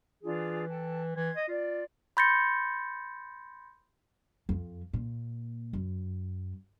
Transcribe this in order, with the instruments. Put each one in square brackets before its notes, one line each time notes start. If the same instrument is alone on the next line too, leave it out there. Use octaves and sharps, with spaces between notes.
[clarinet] E3 [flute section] D4 F4 G#4
[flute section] A4 G5 A5
[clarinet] E3 [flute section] C6 G#6
[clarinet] D#5
[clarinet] F4 [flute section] D5
[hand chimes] B5 C6 G6 A6 A#6 C#7
[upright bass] F2
A#2
F#2